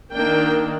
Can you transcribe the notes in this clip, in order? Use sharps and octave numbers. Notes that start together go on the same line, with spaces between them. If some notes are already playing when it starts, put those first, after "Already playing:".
D#3 A#3 D4 G5